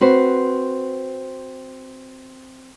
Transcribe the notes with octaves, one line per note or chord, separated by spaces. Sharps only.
C4 F#4 B4 C5